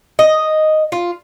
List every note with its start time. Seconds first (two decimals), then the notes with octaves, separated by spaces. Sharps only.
0.19 D#5
0.92 F4